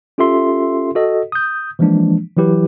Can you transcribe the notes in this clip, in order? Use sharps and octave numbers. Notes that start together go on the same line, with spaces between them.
C#4 F4 G4 A4 E5 C6
F#4 A4 D#5
D#6 G6
E3 F3 G#3 A#3 D4
E3 F#3 E4 G4 B4